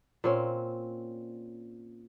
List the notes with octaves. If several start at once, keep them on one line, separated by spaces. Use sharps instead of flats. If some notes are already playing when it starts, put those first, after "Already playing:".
A#2 C4 C#4